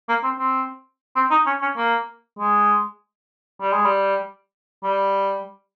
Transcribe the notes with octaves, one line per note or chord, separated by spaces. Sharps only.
A#3
C4
C4
C4
D#4
C#4
C#4
A#3
G#3
G3
G#3
G3
G3